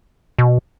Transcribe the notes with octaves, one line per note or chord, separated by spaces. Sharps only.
B2